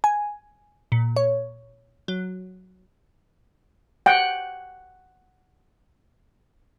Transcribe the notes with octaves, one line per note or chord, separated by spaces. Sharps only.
G#5
A#2
C#5
F#3
F#5 G5